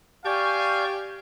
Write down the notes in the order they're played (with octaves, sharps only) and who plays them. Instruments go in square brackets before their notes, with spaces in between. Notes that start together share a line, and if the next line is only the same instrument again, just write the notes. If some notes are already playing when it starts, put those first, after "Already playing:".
[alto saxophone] G4 [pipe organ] D5 C#6 G6 [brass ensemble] F5 G#5